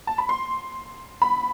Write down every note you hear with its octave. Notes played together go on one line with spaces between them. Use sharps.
A5
B5
C6
B5